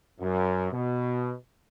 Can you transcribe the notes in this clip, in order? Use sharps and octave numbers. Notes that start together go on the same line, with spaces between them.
F#2
B2